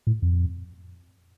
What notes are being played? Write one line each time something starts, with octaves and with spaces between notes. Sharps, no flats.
A2
F2